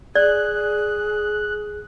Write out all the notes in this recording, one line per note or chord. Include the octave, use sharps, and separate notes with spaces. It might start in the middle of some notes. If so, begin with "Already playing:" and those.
G#4 D5 F#6